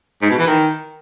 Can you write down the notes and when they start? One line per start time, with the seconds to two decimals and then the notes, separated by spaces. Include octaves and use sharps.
0.22 G#2
0.30 B2
0.39 E3
0.47 D#3